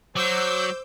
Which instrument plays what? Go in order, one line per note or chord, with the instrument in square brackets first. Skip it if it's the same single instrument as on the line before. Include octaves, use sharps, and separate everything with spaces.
[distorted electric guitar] F#3 [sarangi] C5 [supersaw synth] D6 E6 G6